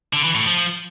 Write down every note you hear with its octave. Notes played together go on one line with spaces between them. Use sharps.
D3
E3
A2
F3